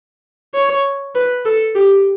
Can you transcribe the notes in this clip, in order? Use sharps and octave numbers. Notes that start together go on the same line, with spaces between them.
C#5
B4
A4
G4